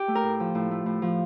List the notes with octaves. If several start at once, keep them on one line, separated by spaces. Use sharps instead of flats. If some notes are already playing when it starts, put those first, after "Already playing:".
Already playing: G4
A3
A#4
A2
F3
A2
A3
A2
F3